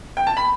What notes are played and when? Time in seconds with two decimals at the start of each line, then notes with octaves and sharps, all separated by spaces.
0.17 G5
0.27 A5
0.37 B5